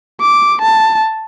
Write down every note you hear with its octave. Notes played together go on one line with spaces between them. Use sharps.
D6
A5